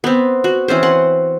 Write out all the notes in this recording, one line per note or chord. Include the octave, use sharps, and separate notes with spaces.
B3 C4
F#4
E3 C4 C#4 C5
F#5 C6